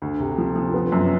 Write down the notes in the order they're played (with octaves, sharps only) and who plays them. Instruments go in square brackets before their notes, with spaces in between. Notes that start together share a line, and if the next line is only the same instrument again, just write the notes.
[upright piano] D2
C3
F3
F3
B3
F#2